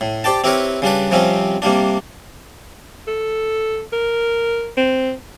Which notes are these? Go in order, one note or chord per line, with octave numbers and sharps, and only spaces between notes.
A2
G4 C5 D5 G5 A5
C4 E4 G4 A#4 B4 C#5
C#3 G3 D4 B4
C3 F3 G3 C4 C#4 G4
C3 G3 A#3 D4
A4
A#4
C4